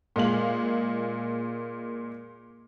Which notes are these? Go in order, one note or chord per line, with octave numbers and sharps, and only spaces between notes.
A#2 G#3 F5 F#7